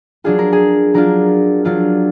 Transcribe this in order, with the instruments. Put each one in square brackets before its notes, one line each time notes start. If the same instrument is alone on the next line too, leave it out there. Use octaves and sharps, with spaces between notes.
[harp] F#3 D4 F4 G#4
A#4
G#4
F#3 D4 F4 A#4
F#3 D4 F4